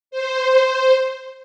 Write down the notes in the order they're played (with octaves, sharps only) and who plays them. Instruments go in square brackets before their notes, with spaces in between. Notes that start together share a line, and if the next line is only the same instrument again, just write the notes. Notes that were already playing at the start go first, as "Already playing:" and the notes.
[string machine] C5